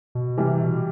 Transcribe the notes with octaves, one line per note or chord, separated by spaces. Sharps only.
B2
C3 E3 G3
B2